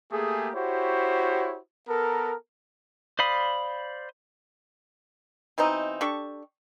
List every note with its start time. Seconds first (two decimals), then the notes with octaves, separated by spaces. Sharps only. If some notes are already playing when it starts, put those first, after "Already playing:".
0.12 A3 A#3 G4 G#4
0.55 E4 F#4 G4 C5 C#5
1.88 B3 A4 A#4
3.19 C5 D5 F5 B5 D#6
5.58 B2 E3 C4 D#4
6.01 D4 G4 A4 C#6